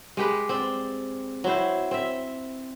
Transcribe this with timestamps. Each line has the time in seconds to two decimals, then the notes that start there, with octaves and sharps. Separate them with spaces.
0.17 G#3 G4 B4
0.49 C4 D5
1.44 F#3 C4 E4 C5
1.91 C4 E5